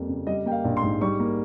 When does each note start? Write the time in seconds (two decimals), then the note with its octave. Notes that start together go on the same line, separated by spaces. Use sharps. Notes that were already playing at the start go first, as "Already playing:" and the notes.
Already playing: F2 G3 A#3
0.09 C#3
0.27 G3 D#5
0.45 A#3 G5
0.52 F5
0.64 A#1
0.77 C6
0.83 G#2
1.01 G3 C#6
1.20 A#3